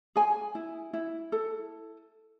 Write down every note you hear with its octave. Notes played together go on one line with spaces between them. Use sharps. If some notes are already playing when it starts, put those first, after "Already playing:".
G#4 G#5
E4
E4
A4